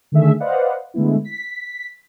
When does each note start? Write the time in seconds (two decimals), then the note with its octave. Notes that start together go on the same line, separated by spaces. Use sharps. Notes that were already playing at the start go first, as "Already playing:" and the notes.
0.12 D3 D#3 A3 G#4 E5
0.40 B4 C5 D5 D#5 F5 F#5
0.94 D3 G#3 A3 B3 E4
1.24 B6